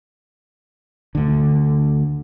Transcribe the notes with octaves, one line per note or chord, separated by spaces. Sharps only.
D2 D3